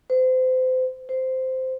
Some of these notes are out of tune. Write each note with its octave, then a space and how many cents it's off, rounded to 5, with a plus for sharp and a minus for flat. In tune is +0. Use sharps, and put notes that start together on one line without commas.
C5 -30
C5 -10